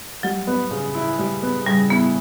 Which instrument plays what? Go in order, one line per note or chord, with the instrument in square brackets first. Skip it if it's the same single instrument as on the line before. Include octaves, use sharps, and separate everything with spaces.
[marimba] F#3 [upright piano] G3
[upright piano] B3
C#3
E4
G3
B3
[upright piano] C#3 [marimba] G3
[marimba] B3 [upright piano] E4